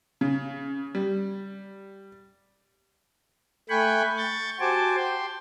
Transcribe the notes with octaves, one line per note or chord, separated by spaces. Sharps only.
C#3
G3
A3 G5 G#5 B5 C#6 F#6
C#6 G6 A6
F#4 G4 C5 G#5 A5 D6
G5 C6